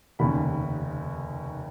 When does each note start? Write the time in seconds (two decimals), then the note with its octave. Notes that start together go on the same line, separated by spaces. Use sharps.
0.19 F1 D#2 C#3 B5